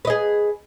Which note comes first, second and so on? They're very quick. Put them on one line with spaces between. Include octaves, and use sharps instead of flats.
B4 D#5 G#4